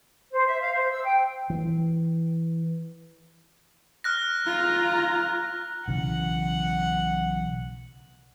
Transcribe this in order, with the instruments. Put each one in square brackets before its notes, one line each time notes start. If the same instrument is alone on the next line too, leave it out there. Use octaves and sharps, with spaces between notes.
[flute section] C5
E5
F5
C5
E6
G5
[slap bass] E3
[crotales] F6 F#6 A#6
[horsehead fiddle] F4 A#5
[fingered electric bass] B1 C#3 E3 [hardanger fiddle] F#5